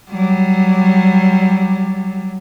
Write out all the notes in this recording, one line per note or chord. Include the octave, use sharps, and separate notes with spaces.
F#3 G3